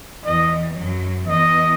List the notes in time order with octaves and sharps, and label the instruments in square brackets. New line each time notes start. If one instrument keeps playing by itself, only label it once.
[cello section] E2 E3 [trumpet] D#5
[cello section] F#2 F#3
[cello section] E2 E3 [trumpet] D#5